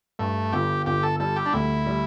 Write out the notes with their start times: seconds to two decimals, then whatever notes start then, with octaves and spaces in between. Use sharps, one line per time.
0.19 G2 A3
0.52 G1 G4
0.86 G1 G4
1.03 A4
1.20 G3 A4
1.36 G4
1.46 D4
1.53 D2 E4
1.86 G3